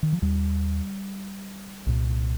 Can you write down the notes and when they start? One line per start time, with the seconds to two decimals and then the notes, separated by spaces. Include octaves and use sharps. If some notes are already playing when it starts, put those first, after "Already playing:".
0.03 D#3
0.12 F3
0.22 D#2 G3
1.86 C2 A#2